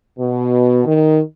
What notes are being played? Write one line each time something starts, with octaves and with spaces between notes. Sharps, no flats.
B2
D#3